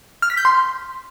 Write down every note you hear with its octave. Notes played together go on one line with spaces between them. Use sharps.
F6
B6
G6
C6